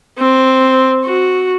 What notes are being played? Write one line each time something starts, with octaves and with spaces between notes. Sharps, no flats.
C4
F#4